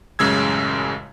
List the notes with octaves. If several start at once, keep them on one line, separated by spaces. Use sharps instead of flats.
A1 F#2 C#3 G#3 E6 G#6